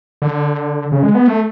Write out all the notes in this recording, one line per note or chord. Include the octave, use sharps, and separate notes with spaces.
D3
C#3
G#3
B3
A3